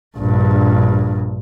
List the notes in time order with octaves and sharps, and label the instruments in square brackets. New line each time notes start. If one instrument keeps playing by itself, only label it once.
[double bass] A#1 G2